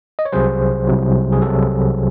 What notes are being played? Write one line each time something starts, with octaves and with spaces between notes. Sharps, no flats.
D#5
C#5
C2 C3 F#3 G#4 C5
C2 C3 F#3
G#4
C2 C3 F#3 F#4 A4